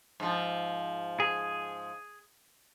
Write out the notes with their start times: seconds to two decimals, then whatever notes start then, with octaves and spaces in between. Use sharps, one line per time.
0.20 G#2 F3
1.20 G#4